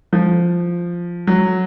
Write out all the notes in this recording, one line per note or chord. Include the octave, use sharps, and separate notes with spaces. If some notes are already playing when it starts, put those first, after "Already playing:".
F3
F#3